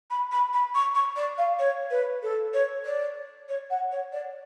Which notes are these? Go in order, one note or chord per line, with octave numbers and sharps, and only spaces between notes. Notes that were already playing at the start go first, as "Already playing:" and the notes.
B5
B5
B5
C#6
C#6
D5
F5
C#5
B4
A4
C#5
D5
C#5
F#5
C#5
D5